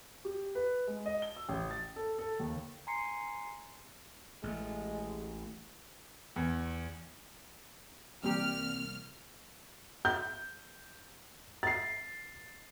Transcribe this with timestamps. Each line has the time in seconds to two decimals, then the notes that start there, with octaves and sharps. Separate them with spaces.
0.25 G4
0.55 B4
0.87 G#3
1.06 D#5
1.22 G7
1.36 E6
1.49 A1
1.71 A6
1.96 A4
2.19 A4
2.40 D#2
2.87 G#5 A#5 C6 C7 C#7
4.43 A1 G#3 A3
6.36 E2
8.24 C2 E3 G3 A#3 C4 G4 F6
10.05 G6
11.63 A6 C7